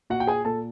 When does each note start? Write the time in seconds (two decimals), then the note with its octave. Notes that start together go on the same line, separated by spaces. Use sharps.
0.10 A#2 F#4 F#5
0.20 G5
0.27 G#4 G#5
0.45 A#2 A4 A5